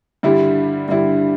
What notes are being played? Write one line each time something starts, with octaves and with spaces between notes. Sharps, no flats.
G2 D3 G3 E4
G2 D3 G3 E4